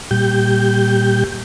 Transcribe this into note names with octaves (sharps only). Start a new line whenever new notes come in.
A#2 G3 G4 G6